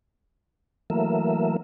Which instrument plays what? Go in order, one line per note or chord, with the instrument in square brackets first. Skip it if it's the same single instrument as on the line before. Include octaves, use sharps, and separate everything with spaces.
[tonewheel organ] E3 F#3 A3 A#3 A#4 E5